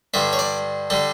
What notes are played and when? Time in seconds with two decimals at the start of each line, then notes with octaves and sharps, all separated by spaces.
0.14 G2 D3 G3 E5
0.33 C#5
0.39 D5
0.90 D3 G3 A4